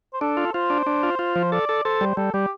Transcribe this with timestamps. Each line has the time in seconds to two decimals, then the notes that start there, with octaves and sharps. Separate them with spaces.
0.14 C5
0.21 D4 A4
0.37 F4
0.54 F4 C5
0.70 D4
0.87 D4
1.03 F4
1.19 F4
1.36 F3
1.52 A4 D5
1.69 A4
1.85 A4 C5
2.01 G3
2.17 G3 A4
2.34 G3 G4